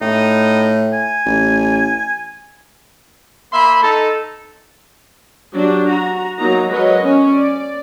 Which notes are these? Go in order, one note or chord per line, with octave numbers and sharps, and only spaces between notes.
A2 D#4
G#5
A1
A#3 E5 B5 C6
D#4 A4
F#3 D4 G4
F#4 A#5
F#3 A#3 D#4 A#5
F#3 G#3 A#4 B4 C#5 D#5
C#4
D5